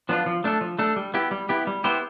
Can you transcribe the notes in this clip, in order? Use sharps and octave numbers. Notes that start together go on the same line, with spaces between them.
F3 B3 D4 F4
F3
A3 D4 A4
F3
A3 D4 A4
G3
B3 E4 G4
G3
B3 E4 G4
G3
B3 E4 G4 C5